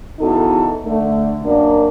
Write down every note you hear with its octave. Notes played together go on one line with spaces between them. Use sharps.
E2 C#3 D#4 F#4 A4
D3 A3
F#2 A#3 D4